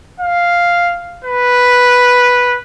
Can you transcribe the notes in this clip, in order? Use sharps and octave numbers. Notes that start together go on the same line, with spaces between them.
F5
B4